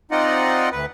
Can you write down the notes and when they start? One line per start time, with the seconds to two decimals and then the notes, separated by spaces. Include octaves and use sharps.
0.11 C4 D#4 F4 D5 D#5 F#5
0.72 D2 B4